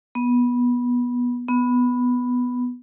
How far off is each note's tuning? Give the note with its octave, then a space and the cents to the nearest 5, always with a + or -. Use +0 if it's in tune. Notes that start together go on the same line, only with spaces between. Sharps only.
B3 -15
B3 +0